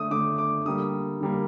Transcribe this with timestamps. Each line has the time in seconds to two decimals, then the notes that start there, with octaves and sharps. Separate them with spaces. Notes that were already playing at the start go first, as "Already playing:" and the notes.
Already playing: D3 A3 D#6
0.10 D3 A3 D6
0.38 D6
0.65 D3 G3 A#3 D#6
1.20 D3 G3 A#3